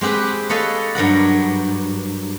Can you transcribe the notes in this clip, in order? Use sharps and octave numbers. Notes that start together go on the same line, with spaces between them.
G#3 C4 G4 G#4 B4
A4 B4 C#5 D#5 F5
G2 F#3 A#4 F#5